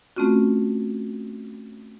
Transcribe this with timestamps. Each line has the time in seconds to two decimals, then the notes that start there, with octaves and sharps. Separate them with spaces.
0.16 A3 C4 C#4 F4 F#4